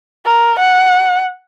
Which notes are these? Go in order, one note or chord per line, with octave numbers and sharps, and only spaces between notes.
A#4
F#5